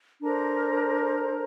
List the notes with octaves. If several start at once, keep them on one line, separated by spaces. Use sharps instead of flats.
D4 A4 A#4 C5 A#5